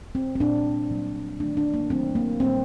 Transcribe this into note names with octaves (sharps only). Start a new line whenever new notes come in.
C4
C4
A#2 G3 A#3 D4
A#2 F#3 A#3
D#3 A3 D4
D4
A#3
D#3 F#3 A3 C4
A#3
A#2 G3 A#3 C4